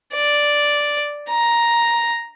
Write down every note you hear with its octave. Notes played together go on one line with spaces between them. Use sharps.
D5
A#5